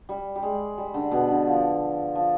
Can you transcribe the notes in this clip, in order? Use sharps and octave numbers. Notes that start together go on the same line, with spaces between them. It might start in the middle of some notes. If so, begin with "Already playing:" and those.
G3
G3
G#3
G3
D3
B2
D3
F3
F3